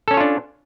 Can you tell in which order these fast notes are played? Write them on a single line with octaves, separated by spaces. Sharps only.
A4 C#4 C#5 F4 D4